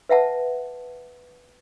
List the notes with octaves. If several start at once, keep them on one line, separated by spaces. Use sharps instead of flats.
B4 E5 F#5 A5